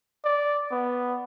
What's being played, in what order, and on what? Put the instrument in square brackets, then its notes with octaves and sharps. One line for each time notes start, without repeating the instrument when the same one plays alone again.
[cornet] D5
B3